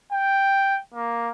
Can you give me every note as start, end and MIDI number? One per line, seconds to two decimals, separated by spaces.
0.12 0.79 79
0.94 1.30 58